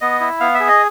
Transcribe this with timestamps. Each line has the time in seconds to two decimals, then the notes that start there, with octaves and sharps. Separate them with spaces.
0.01 B3 D#5
0.20 E4
0.40 B3 F5
0.54 E5
0.60 G#4
0.68 D#5